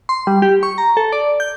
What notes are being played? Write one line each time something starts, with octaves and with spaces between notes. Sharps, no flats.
C6
G3
G4
C#6
A#5
A4
D5
G6